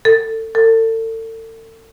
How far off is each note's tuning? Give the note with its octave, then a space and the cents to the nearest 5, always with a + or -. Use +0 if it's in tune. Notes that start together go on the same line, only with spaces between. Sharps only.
A4 +25
A4 +40